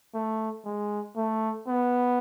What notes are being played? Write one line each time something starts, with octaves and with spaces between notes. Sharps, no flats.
A3
G#3
A3
B3